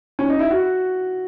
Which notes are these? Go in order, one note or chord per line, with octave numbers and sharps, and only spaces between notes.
C#4
D#4
E4
F#4